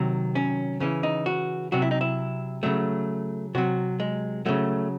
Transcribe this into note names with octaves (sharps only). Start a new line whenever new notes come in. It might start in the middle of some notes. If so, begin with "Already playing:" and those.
Already playing: C3 D#3 F#3
C#4
C#3 E3 C#4
D#4
F#4
C3 F#3 F#4
E4
D#4
E4
C#3 F#3 A3
C3 F#3 F#4
G#3
C#3 F#3 A3